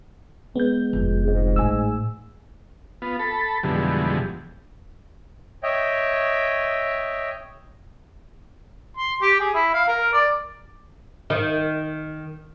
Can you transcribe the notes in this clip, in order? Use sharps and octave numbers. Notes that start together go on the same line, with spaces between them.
G#3 B3 G6
F1
G#2
A1 A3 G#5 E6
B3 F4
A4 B5
F2 B2 D3 E3 G3 G#3
C#5 D#5 E5 G5
C6
G4
G#4
E4
F5
A#4
D5
D#3